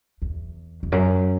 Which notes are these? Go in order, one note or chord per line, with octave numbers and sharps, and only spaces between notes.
E2
E2
F#2